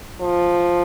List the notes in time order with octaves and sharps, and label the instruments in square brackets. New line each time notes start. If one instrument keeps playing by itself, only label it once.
[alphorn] F3